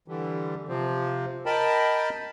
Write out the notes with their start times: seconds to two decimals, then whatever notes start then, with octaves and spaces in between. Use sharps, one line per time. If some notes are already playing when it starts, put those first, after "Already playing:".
0.08 D3 E3 G3
0.68 C3 F3 C4
1.46 A#4 D#5 G5 A5 B5